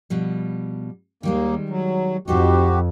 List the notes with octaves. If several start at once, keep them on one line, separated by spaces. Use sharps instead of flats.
B2 F3 G3
D#2 D#3 G3 G#3 A#3
F#3
F2 D#4 F#4 G4 A4 C5